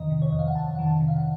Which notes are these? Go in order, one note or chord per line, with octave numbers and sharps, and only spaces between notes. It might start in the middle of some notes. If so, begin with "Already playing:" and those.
Already playing: F2 D#3 D#5
C3
C#5
F2 D#5
F5
F#5
F2 A5
D#3 F#5
A5
C3
F5
F#5